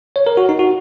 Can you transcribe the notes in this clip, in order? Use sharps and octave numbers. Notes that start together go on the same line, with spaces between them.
C#5
A#4
F#4
D#4
F#4